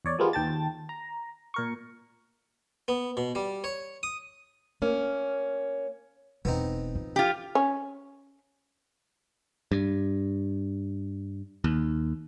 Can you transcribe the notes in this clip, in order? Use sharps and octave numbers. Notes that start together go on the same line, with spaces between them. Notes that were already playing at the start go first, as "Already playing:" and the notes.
E2 C#5 D5
F3 G3 G#3 A#3 B3 F4
D#2 G5 A5 A6
A#5
A#2 A#4 C#6
B3
B2
G3
C#5
D#6
A#3 C#4
E1 B3 C4 D#4
F3
F4 G4
C#4
G2
D#2